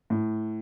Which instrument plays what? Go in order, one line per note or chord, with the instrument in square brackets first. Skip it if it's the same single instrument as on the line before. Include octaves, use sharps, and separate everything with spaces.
[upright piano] A2